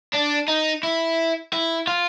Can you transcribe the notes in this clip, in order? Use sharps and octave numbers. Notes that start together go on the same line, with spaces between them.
D4
D#4
E4
E4
F4